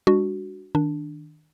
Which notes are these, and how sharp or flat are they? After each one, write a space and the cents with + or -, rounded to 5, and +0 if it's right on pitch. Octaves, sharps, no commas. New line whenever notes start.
G#3 -45 D4 +0 F#4 +0
D#3 +0 D4 +0